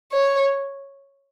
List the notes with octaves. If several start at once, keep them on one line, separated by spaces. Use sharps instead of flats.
C#5